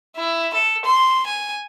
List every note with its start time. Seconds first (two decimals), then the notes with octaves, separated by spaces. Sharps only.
0.17 E4
0.54 A4
0.85 C6
1.27 G#5